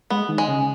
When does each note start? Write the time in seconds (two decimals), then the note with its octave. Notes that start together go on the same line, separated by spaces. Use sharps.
0.10 G#3 B3
0.29 D#3
0.38 G#3
0.48 C#3